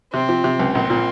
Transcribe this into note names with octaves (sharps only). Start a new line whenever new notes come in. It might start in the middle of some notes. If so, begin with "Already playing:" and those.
C3 C4
F3
C3
C#2
A#1 C4
A#2